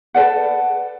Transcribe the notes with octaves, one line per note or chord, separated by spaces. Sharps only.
A4 B4 D5 F#5